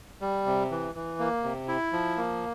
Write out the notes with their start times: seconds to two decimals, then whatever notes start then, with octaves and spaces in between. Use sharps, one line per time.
0.21 G3
0.46 C3
0.71 E3
0.95 E3
1.19 A#3
1.44 C3
1.68 E4
1.93 F3
2.17 A#3